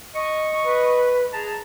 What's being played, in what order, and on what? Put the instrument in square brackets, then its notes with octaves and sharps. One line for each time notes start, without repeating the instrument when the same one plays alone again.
[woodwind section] D#5 C#6
[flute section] B4
[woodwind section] G#4 A5 A#5